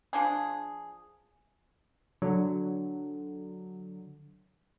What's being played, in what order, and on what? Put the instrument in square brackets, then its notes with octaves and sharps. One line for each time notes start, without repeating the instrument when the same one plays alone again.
[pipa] F3 D4 G#4
[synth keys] D3 F#3